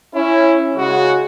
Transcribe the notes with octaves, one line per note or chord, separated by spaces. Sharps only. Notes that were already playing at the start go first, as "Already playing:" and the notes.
C#4 E4
C#3 G#3 F#4